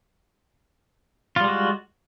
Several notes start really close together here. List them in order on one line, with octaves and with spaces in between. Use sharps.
F4 G3 G#3 F#4